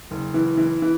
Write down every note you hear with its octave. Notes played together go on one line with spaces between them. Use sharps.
F#1
E3
E3
E3